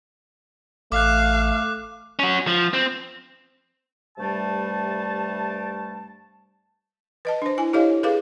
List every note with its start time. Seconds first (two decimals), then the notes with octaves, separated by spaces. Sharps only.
0.92 A1 A3 F5 D6 F#6
2.19 C#4 F#4
2.47 F3
2.74 C4
4.18 G2 C3 G3 A3 A5
7.25 B4 D#5 A5
7.42 D4 C5
7.58 E4 G#5
7.73 E4 G4 A4 C#5 D#5 F5
8.03 G#4 A4 B4 F5 D6